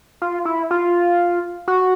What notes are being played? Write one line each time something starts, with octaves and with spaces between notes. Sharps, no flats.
F4
E4
F4
F#4